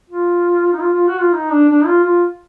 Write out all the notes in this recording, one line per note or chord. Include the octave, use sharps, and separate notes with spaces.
F4
D#4
F4
F4
F#4
F4
D#4
D4
D4
F4
F4